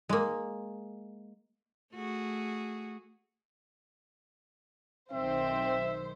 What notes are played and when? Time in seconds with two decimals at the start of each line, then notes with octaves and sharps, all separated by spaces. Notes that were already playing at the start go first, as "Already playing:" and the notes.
0.09 G#3 A#3
1.92 A3 F#4 G#4
5.12 B1 D#3 C4 C5 E5